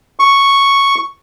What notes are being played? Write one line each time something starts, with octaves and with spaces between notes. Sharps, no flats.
C#6